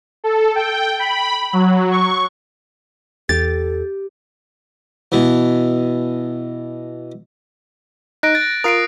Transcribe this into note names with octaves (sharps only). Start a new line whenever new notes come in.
A4
G5
B5
F#3
C#6
E2 G4 A4 A6
B2 E3
D#4 F#6 A#6 D7
A6 A#6
F4 A#4 D#6 C7 D7